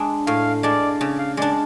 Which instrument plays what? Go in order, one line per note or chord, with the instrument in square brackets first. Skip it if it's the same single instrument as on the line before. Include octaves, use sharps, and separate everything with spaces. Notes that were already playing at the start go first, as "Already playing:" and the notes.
Already playing: [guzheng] G#3 D4
[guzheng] A2 [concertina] F5
[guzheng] G#3 D4 [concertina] D5
[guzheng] C#3
[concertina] F5
[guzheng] G#3 D4 [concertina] D5